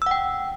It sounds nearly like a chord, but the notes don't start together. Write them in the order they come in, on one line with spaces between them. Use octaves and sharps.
E6 F#5 G5